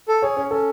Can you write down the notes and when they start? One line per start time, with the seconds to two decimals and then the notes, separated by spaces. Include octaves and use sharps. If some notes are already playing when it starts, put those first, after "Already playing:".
0.08 A4
0.22 G#4 C#5
0.37 C#4 C#5
0.51 C#4 A4